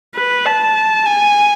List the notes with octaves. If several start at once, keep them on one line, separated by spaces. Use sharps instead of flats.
B4
A5
G#5